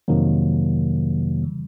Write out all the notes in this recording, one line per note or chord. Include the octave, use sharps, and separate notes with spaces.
F2 C3 D#3 F#3 A#3
C#3 E3 G3